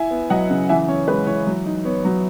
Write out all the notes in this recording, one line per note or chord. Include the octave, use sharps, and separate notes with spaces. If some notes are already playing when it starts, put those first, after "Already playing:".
Already playing: E4 E5 G#5
B3
F#3 D#5 F#5
C#3
E3 E5 G#5
C#4 C#5
G#3 B4
E3 C#5
F#3
D#4
B3 C#5
F#3